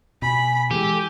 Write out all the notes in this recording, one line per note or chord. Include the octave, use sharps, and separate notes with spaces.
B2 G#5 B5
E3 G#3 G4 A4 G#5